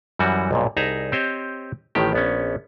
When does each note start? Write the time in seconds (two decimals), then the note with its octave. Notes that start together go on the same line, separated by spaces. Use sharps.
0.19 F#2 E3 G3 F#4
0.51 B1 G2 A#2
0.77 C2 D#4 G#4 E5 A5 A#5
1.12 C4 G4 C5 C#5 D#5
1.95 A1 A2 D#3 G4
2.13 A#1 B3 C#4